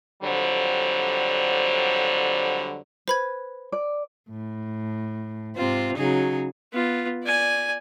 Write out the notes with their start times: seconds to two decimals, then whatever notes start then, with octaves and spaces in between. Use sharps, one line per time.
0.22 F2 D3 F#3 G3 C5
3.08 B4 C5 B5 G#6
3.72 D5
4.30 A2
5.57 G#2 C3 C4 F4
5.97 C#3 F#3 D#4 G#4
6.73 B3 F4
7.23 D5 G#5